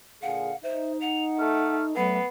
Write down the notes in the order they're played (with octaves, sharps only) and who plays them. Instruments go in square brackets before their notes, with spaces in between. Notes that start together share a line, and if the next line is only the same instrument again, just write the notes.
[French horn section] A#2 D3 G#4 [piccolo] F5 [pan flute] F#5
[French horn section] D#4 [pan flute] C5 [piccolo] E5
[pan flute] F#5 [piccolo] F7
[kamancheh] A3 [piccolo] F6
[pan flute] F#3 [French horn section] A3 [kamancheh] B3 [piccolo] C7